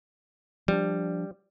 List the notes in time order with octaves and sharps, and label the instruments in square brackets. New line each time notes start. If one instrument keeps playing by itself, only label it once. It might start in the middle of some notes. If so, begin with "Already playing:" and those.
[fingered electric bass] F3 C4 D4 [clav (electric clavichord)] G3